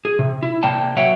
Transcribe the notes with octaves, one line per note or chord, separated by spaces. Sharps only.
G#4
C3
E4
C3 A#3 D5 G5 A5
F#3 B4 C#5 E5 F#5 G5